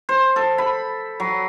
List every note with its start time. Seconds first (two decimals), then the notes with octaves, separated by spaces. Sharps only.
0.09 C5
0.36 A4
0.58 B5
1.20 F#3